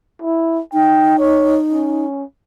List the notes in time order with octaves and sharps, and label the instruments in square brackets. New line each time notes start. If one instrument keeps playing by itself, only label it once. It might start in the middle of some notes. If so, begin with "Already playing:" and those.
[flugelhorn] E4
[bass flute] D#4 [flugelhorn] G5
[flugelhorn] C#5
C#4